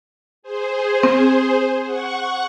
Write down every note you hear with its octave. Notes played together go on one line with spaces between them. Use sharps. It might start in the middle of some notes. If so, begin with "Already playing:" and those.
G#4 C5
C4
F#5 C#6